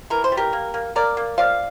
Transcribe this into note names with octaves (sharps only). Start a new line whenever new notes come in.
E3 A#4
C5
G3
G4 A#4
A#3
A#3
A#3 A#4 D5
A#3
F3 D5 F5